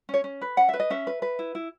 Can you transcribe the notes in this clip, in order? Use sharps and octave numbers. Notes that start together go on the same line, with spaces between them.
C#4 C#5
C#4
B4
C#4 F#5
B4 E5
D#5
C#4 E5
B4
B4
E4
E4